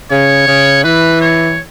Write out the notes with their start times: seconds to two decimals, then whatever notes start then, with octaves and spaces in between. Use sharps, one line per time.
0.11 C#3 C#5
0.48 C#3
0.84 E3 B4
1.21 C#5